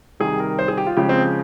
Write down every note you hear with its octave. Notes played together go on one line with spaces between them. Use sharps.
C3 D#3 G3 G#4
A#4
C5
G#4
G4
F4
C#3 F3 G#3 G4
C4